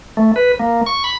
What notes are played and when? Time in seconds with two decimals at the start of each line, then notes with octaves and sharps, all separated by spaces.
0.17 A3
0.36 B4
0.60 A#3
0.86 C#6
1.04 B5